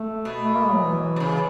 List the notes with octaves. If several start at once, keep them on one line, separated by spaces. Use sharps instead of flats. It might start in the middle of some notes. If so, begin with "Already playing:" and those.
Already playing: A3
B2
A3
A#3
G#3
F#3
E3
C3
C#3